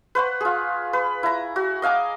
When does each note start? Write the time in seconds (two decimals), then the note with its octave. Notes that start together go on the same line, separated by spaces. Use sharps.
0.15 B4 C5 F#5 C#6
0.41 F4 G#4
0.93 B4
1.23 E4 A#5
1.56 F#4
1.82 D#5 F5 G#5 D6